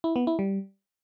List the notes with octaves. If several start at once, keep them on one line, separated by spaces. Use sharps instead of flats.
E4
B3
E4
G3